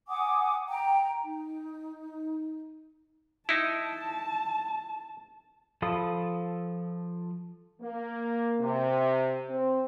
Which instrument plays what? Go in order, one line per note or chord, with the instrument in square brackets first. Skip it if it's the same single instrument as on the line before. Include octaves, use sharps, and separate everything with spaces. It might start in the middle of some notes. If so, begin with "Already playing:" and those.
[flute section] F#5 G#5 D6 D#6
G5 A#5
D#4
[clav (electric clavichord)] D#4 E4 [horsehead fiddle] A5
[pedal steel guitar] F3 A4 F5 B5 D#6
[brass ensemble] A#3
C3
C4